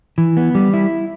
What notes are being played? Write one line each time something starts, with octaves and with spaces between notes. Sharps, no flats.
E3
B3
G3
E4